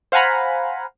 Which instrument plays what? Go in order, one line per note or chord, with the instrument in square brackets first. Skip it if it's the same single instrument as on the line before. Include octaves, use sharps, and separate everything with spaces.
[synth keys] C5 F5 F#5 G#5 A#5 B5